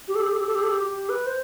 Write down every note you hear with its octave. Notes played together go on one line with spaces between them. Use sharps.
G4
A4
G4
A4
G4
A4
G4
A4
G4
G4
B4
C5